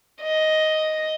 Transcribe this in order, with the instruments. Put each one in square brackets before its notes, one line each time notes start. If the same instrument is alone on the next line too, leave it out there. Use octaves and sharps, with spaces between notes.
[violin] D#5